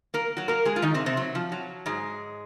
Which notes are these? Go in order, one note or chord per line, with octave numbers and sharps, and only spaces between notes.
A#3 A#4
F#3 F#4
A#3 A#4
G#3 G#4
F4
D#3 D#4
C3 C4
C3 C4
F#3
F3
F#3
G#2 G#3